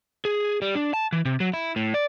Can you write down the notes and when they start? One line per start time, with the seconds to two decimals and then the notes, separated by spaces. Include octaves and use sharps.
0.25 G#4
0.62 G3
0.75 D4
0.94 A5
1.13 E3
1.25 C3
1.40 F#3
1.54 E4
1.76 A2
1.94 D5